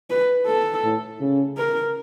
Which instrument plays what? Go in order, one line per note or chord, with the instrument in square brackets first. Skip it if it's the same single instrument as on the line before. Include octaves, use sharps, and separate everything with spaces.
[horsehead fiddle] B4
A4
[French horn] A2
C#3
[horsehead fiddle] A#4